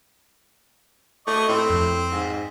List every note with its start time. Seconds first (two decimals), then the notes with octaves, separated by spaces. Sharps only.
1.27 A3 D#5 C#6 D6
1.48 A2 C4
1.70 F2
2.12 G#2